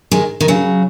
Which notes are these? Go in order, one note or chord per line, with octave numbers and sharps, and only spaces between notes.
D#3 G#3
D#3
C#3 F#3